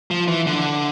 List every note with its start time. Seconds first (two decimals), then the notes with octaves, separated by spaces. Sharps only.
0.11 F3
0.28 E3
0.47 D3